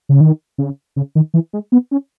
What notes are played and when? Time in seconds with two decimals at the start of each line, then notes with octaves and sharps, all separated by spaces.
0.09 C#3
0.21 D#3
0.58 C#3
0.96 C#3
1.15 D#3
1.34 E3
1.53 G#3
1.72 B3
1.91 C#4